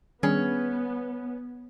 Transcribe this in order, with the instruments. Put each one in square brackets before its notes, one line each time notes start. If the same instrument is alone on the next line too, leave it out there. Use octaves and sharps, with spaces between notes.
[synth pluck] D#3 G3 G#4 [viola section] B3 [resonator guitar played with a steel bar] C#4